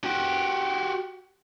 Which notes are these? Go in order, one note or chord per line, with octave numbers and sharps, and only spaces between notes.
F#4 G4